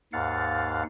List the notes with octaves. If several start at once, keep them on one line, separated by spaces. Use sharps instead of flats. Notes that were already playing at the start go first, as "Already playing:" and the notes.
D#2 G#2 F5 F#5 A6